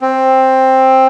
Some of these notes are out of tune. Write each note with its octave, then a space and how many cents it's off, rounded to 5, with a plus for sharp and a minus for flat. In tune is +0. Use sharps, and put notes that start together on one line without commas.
C4 +10